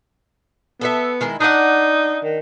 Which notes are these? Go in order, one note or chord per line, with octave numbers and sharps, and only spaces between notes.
B3 A4 B4 E5
D#3 G#3 E4
D4 D#4 D5 F#5
D#3